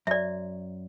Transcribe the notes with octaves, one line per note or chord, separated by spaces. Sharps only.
F#2 D5 E5